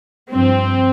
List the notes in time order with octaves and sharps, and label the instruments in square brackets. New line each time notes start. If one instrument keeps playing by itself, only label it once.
[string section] G2 F3 C4